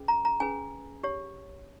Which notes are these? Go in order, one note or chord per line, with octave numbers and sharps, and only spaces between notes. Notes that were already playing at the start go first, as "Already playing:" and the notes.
Already playing: C#4 G#4 B4
A#5
A#5
C#4 G#4 B4 G#5
G4 C#5